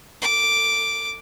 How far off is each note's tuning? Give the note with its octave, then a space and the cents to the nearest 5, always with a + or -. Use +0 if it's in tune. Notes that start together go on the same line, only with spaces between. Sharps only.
A4 +30 D6 +0